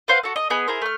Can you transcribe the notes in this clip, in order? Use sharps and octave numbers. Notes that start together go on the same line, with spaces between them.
B4 C5 F5 F#5
F#4 A4
D#5
B3 G#4 D#5
E4 G#4 A#4 C5
A3 F6